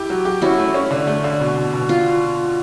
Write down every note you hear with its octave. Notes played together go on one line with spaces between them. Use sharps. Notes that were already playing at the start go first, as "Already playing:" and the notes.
Already playing: E4 G4
F#3
G4
C#4 E4 F#4
A3
C#4
D3
A3
D3
B2
B2
B2
F4